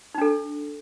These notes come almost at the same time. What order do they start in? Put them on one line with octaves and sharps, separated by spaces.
D#4 D4 A4